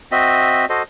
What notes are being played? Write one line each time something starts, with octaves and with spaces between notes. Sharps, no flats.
C4 F#4 D#5 E5
F#4 A4 C5 D#5